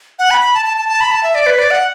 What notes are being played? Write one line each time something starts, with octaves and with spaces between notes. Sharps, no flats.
F#5
B5
B5
A5
A5
A5
A5
B5
A5
E5
D5
B4
D5
F#5